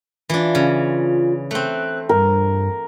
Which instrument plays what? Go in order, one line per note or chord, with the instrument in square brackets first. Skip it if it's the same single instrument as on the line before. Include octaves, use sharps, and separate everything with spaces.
[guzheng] E3 D4 [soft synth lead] F4
[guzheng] C#3
[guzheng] A3 C4 [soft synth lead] F#6
[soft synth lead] G2 [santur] A#4